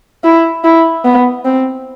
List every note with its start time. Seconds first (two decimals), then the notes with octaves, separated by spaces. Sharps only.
0.24 E4
0.64 E4
1.04 B3
1.44 C4